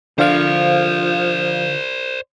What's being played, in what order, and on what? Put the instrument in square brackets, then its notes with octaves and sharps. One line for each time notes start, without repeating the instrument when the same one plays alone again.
[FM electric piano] D3 F4 F5 [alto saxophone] F3 [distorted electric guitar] C5 D5